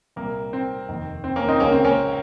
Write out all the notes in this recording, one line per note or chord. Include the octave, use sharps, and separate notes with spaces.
C2 A#2 A#3
C4
F1 D#2 D#3
C4
A#3 C#4
C4 D#4
C#2 C#3 A#3 C#4
C4
A#3 C#4